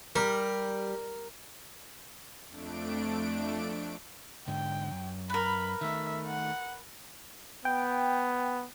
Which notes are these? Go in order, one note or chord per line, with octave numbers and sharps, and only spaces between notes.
G3 A#4
F2 A3 D4 D7
G#2 D3 G5
F#2
A#4 B4 B5
D#3 A3 E5
F#5
B3 G5